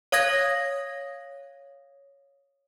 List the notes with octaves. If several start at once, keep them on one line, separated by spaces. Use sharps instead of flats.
C#5 F5 D#6 G#6 A#6